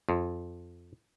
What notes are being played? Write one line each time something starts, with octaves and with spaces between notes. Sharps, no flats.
F2